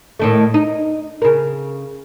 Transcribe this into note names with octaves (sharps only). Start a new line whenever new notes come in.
A2 D#3 A3
D#4
C#3 A#4